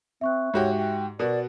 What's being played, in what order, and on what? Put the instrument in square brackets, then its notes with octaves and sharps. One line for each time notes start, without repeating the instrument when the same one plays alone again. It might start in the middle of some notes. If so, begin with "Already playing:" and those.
[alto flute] C4 [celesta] E5 C#6 F#6
[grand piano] G#2 F#4 G4 [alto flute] C#5
[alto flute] G5
[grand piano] B2 F#4 [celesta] A#4 [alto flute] D5